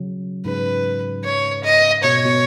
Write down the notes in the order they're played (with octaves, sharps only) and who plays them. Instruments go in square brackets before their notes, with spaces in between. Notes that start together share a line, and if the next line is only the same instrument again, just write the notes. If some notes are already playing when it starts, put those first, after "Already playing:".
Already playing: [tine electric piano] C#3 F#3
[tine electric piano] G#2 C#3 [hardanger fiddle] B4
[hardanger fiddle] C#5
D#5
[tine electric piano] B2 [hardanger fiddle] C#5
[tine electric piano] B2